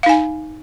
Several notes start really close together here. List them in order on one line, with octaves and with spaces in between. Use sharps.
F5 D#4 G#5